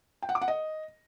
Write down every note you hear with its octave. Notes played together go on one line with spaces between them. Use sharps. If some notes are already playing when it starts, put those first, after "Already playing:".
G5
F#5
D6
F#5
D#5